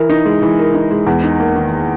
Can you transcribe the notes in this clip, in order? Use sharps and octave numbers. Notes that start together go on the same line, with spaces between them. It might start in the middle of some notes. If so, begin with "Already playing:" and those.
Already playing: E3 A#4
D#4
G#3
E3
A#4
D#4
G#3
E2
D#4
A#3
D#3